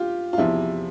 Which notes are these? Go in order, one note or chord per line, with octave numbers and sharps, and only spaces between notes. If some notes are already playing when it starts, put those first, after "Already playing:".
Already playing: F4 G4
F4
E2 C3 F3 E4